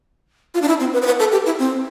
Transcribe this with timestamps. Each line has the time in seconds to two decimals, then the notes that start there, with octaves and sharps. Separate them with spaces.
0.54 F4
0.62 D4
0.68 E4
0.80 C4
0.93 B4
1.02 C5
1.06 B4
1.19 A4
1.32 G4
1.46 E4
1.59 C4